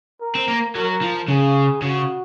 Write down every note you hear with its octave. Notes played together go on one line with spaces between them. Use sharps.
A#4
C4
A#3
F#3 A#4
F3
C#3 G#4
C#3 F#4